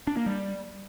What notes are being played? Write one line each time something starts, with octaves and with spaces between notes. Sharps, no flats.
D4
A#3
G3